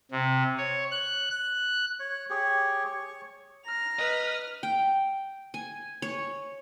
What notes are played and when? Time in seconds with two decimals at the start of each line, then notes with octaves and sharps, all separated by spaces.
0.11 C3
0.58 C#5
0.91 F#6
1.30 F#6
2.00 C#5
2.30 G4 G#4 C#5
2.85 C#5 C#6
3.66 A#5 F6
3.99 B4 D#5
4.63 G5
5.54 G#5
6.02 C#5